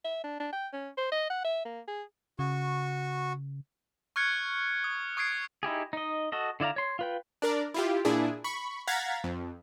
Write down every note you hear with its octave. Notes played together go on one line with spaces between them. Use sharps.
E5
D4
D4
G5
C#4
C5
D#5
F#5
E5
A#3
G#4
C#3 F#4 C#6
C#6 F6 F#6 G#6 C#7
D#6
C#6 D#6 G#6 C7 D7
D#4 E4 G4 G#4
D#4 D#5
F#4 A4 D#5
D3 E4 D5 F5 A#5
C#5 C6
F4 B4 G5
D4 A#4 D5
E4 F4 G4
A#2 D4 E4 G#4
B5 C#6
F5 F#5 A#5 G#6 A6 B6
F2